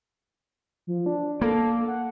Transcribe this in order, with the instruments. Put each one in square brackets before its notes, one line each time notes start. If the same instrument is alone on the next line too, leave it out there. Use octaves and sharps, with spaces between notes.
[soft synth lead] F3
D4
[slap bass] A#3 [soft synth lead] A4
[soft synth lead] F#5